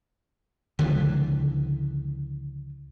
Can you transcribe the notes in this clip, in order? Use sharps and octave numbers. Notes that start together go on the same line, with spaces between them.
C#2 D3 E3 F3